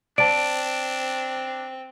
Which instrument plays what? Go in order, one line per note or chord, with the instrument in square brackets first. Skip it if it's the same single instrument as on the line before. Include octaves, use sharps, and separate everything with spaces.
[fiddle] C4 [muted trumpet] D4 [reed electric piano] D5 A5 [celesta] D7